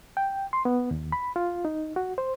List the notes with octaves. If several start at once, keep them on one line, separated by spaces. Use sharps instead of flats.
G5
C6
B3
D#2
B5
F4
D#4
F#4
C5